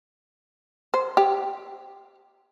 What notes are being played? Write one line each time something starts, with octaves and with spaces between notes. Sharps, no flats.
C5
G4